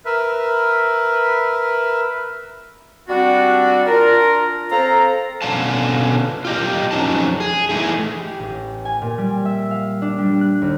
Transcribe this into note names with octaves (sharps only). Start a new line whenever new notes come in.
A#4 B4 E5
G3 C4 D4 F#4
D4 F4 A#4
C4 A4 F5 A#5
B2 D3 G#3 C#4 F5 A5
F4 G4 D#5
F2 F#3 C#4 D#4 A5
G#4
E3 A3 D#4 E4 G#4
G4
A1
G#5
A#2
G3
E5
F5
D4
G3
F#6
D#2